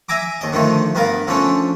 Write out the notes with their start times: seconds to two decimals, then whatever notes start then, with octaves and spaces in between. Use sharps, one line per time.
0.09 E5 G#5 A#5 D6
0.41 D#2 D#5
0.53 D3 D#3 F3 A3
0.95 G2 B3 A#4 F5
1.28 D3 F3 A3 C#4